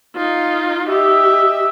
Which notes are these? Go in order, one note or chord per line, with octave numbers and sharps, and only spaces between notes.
D#4 F4
G4 D#5 E5